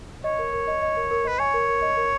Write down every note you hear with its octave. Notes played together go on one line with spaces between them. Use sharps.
C#5 D#5
A#4
A#4
D#5
D#5
A#4
A#4
B4 D#5
C#5 G#5
A#4
A#4
D#5
A#4